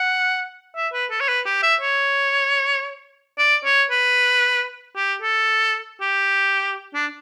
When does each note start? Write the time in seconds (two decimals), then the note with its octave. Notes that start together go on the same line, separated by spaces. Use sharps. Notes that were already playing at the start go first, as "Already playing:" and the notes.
Already playing: F#5
0.76 E5
0.93 B4
1.11 A4
1.21 C#5
1.29 B4
1.46 G4
1.63 E5
1.81 C#5
3.38 D5
3.65 C#5
3.90 B4
4.96 G4
5.22 A4
6.01 G4
6.94 D4